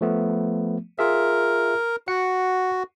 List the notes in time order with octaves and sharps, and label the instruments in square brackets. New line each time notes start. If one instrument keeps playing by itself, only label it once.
[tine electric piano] F3 A3 B3
[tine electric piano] F4 G#4 E5 [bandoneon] A#4
[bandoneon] F#4 [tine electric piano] F#5 C#7